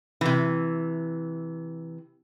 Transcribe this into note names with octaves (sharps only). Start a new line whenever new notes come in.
C3 E3